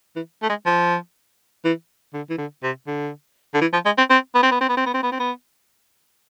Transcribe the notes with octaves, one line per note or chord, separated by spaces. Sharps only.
E3
A3
G#3
F3
E3
D3
E3
D3
C3
D3
D3
E3
F3
G#3
C4
C4
B3
C4
B3
C4
B3
C4
B3
C4
B3
C4
B3